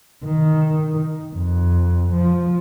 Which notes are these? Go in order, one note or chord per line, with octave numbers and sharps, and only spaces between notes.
D#3
F2
F3